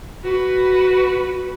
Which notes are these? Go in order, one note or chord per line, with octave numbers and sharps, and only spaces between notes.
F#4 B4